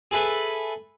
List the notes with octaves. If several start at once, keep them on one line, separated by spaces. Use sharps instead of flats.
G#4 A4 B4 E5